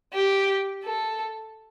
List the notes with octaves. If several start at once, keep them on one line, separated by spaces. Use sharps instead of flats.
G4
A4